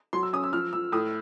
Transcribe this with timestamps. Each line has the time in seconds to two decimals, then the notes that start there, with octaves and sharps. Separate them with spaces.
0.13 F#3 C6
0.23 E6
0.33 C#4 D#6
0.43 E6
0.53 F3 F6
0.73 F3 E6
0.92 A2 D#6